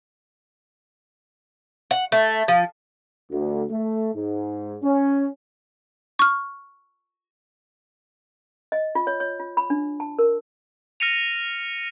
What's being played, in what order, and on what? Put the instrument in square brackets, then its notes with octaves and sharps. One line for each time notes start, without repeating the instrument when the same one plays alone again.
[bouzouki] F#5
A3
F3
[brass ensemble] D2
A3
G#2
C#4
[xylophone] C#6 F6
[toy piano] D#5
F4
C#5
C#5
F4
B5
D4
A5
A#4
[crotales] F6 A#6 C#7 D#7 F7